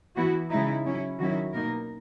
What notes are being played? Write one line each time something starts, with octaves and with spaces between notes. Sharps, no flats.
E3 B3 E4 F#4
C#3 G#3 D#4 E4
F#3 C#4 E4
D#3 F#3 C#4 E4 F#4
B2 A#3 D#4 A#4